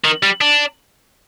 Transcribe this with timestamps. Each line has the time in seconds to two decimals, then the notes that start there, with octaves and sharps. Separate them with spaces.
0.05 D#3
0.23 G3
0.41 D4